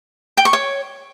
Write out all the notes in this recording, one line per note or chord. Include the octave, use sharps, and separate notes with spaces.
G5
C#6
C#5